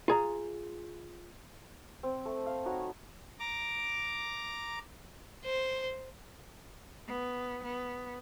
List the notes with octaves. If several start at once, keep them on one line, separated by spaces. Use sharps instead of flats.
F4 G#4 A#5
C4
A3
F5
D#4 F#4 C#5 B5
A#5 D6
C5
B3
B3